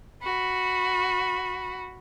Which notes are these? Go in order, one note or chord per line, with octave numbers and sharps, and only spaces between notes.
F#4 B5